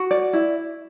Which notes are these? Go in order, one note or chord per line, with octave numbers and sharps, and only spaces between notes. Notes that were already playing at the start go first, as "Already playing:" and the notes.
Already playing: F#4
D5
E4